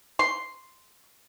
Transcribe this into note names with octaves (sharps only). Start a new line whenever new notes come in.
C6